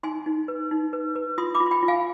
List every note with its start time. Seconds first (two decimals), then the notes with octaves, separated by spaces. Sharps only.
0.03 D#4 G#5 C6
0.26 D#4
0.48 B4
0.71 D#4
0.93 B4
1.16 B4
1.38 F4 C6 D#6
1.54 B5 D6
1.60 F4
1.66 C6
1.71 G5 B5
1.83 F4
1.88 F5 G#5